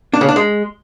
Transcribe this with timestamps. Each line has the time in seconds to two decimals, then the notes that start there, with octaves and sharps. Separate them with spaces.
0.13 D4
0.21 C#3
0.28 D4
0.36 G#3